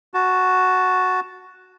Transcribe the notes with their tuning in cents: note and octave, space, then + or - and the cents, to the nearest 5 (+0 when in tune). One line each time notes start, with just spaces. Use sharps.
F#4 +0 A5 +0